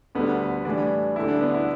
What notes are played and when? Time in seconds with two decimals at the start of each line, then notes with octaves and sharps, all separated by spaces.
0.15 D2 D3 G3 B3
0.65 A2 E3 G3 D4
1.16 D2 D3 G3 E4
1.28 D4
1.41 B3
1.54 E4